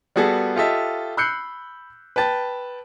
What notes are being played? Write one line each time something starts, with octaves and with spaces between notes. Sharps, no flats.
G3 B3 F#4 G#4 A4
F4 G4 A4 D#5 E5
B5 E6 F#6 G6 C7 C#7
B4 G5 A5 A6